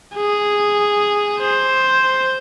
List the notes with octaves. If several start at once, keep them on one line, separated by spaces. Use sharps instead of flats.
G#4
C5